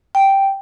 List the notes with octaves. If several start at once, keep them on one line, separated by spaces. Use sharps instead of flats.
G5